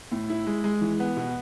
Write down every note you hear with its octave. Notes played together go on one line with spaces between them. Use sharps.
A2
E4
G#3
G#3
E3
B3
B2